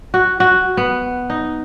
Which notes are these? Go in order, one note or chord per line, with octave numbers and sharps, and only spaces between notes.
F#4
F#4
B3
D#4